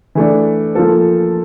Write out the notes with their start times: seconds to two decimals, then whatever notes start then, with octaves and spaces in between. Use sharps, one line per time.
0.15 E3 A3 D4
0.75 F3 A#3 F4 A4